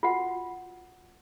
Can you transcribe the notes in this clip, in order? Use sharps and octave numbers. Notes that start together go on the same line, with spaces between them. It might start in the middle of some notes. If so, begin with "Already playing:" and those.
F4 F#4 F#5